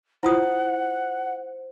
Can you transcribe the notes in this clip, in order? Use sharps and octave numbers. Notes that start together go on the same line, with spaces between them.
E4 F4 C5 F#5 D#6